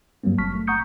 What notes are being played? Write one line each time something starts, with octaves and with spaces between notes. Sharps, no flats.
G2 F#3 G3 A#3 C4
G1 A5 C#6 F6 B6
A3
F#5 A#5 C#6 D#6 G6 C#7